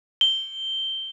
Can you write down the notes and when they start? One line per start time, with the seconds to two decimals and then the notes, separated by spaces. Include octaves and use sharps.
0.21 G7